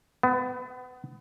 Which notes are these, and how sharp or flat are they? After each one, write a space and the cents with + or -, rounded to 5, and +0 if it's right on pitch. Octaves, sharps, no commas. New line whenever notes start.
B3 +30